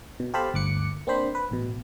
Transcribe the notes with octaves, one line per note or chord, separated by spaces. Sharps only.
B2
G4 A4 C5 F5 A5 B5
G1 D2 D6 F#6 C#7
A#3 C4 D4 C5 B5
B4
A1 B2